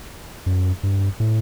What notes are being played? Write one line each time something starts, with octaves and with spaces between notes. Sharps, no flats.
F#2
G2
A2